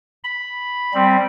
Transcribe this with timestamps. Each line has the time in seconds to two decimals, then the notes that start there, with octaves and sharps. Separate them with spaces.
0.24 B5
0.94 G3 C4